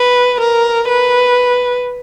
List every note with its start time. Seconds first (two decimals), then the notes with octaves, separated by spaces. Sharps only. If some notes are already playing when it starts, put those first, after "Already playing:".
Already playing: B4
0.41 A#4
0.89 B4